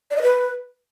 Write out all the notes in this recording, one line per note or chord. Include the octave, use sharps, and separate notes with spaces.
D5
D#5
B4